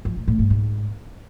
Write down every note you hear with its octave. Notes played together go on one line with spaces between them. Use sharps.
F3
A2
A2
G2
G#2